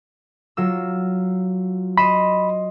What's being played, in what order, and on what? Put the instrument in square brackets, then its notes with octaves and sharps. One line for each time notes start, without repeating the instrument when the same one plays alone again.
[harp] F#3 F4 E6
[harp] D#5 C6 E7 [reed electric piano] B5